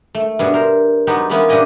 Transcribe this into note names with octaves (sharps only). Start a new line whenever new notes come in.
A3
G2 B2 G#5
A#4 C5
F#3 G#3 B3 D#4 G4
E3 G#3 A#3 B3 C#4 E4
G2 A#2 D4 G4 D#5 G#5